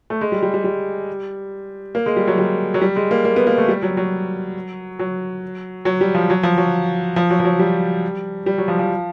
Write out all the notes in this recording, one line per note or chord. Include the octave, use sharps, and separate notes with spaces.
A3
G#3
G3
G3
G3
G3
A#3
G#3
G3
F#3
G3
F#3
G3
G#3
A#3
A#3
B3
A#3
A3
G3
F#3
F#3
F#3
F#3
G3
F3
F#3
F3
F#3
F3
F#3
F3
F#3
G3
G3
F#3
F3
F3